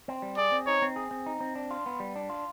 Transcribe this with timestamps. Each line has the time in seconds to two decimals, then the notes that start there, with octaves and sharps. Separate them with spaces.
0.08 C4
0.22 G3
0.37 G#4 D5
0.52 C4
0.67 D#4 C#5
0.82 C4
0.96 G#4
1.11 C4
1.26 D#4
1.41 C4
1.56 D4
1.71 F4
1.86 B3
2.00 G3
2.16 D4
2.30 F4